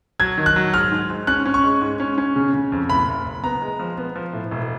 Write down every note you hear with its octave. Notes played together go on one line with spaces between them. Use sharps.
F#3 G#6
D#3
F#6
F#3
G#2 F6
G#2
G#2
C#4 F#6
C#4
C#6
G#3
G#2
C#4
C#4
C#3
C#3
F2
F#1 B5
F#1
F#1
B3 A#5
G#3
F3
B3
F3
A2
E1